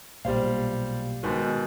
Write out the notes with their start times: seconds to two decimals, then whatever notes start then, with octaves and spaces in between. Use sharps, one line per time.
0.25 B1 A#2 G3 C5 F5
1.23 G#2 B2 D#3